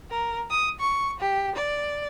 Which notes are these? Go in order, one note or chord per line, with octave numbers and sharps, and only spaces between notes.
A#4
D#6
C#6
G4
D5